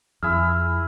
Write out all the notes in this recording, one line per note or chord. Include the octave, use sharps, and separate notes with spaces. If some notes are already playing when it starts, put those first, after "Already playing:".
F2 E4 G#4 E6 F6